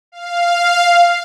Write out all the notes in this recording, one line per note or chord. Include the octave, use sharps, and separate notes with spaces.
F5